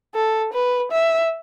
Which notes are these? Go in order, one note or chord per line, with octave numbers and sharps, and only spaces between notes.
A4
B4
E5